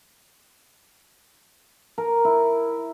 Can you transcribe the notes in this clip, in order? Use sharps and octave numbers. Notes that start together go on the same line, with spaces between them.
A#4
E4